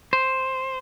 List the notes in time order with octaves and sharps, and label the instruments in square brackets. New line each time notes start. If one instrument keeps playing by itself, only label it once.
[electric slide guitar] C5